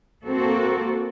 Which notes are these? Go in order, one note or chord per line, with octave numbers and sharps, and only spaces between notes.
A#3 C4 F#4 A4